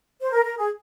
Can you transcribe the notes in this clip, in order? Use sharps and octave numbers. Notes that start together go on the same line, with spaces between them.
C5
A#4
A#4
G#4